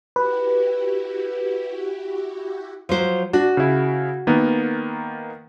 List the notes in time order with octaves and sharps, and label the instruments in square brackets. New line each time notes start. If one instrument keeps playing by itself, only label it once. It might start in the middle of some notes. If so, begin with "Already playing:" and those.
[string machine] E4 F#4 G4 [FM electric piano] B4
[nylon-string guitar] F3 F#3 C5
[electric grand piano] D4 [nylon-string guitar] F#4
[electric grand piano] C#3 E4
D#3 A#3 B3